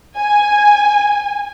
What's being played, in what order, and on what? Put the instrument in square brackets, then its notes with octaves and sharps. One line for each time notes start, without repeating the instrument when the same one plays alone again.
[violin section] G#5